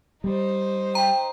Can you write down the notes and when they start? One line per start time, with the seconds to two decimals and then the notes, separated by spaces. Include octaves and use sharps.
0.24 G3 D#4 C5
0.95 G5 A#5